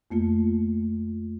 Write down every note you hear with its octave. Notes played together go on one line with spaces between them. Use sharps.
F2 A3 A#3 F4